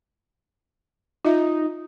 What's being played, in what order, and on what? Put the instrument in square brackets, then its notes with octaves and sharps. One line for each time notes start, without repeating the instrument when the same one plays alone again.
[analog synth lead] D#4 [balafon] F4 E5